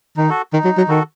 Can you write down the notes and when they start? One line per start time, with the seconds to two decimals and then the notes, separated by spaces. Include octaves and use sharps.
0.17 D#3 D#4
0.29 F#4 A4
0.53 D#3 D#4
0.65 F#3
0.77 F#3
0.88 D#3 F#4 A4